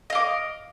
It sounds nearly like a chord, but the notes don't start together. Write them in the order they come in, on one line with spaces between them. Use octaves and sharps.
D#5 F5 D6